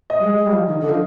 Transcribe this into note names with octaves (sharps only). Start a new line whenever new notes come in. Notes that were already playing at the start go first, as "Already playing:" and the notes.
D#5
G3
G#3
G#3
G3
F3
D#3
D3
F3